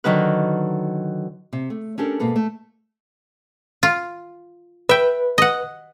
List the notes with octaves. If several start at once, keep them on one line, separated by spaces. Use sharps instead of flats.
D3 D#3 F#3 D#4 B4
C3
A3
C#4 D4 G4 A4 A#4
G#2 B2 A#3 A4 B4
A3
F4
B4 E5 G5
D#5 F#5